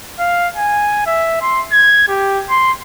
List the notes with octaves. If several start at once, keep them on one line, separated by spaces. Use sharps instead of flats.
F5
G#5
E5
C6
G#6
G4
C6